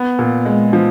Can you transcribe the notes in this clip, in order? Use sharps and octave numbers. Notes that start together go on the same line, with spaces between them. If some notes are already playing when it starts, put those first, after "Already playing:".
Already playing: B3
A#2
G#3
F3